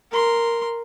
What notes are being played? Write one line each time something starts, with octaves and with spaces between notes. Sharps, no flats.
A#4 C6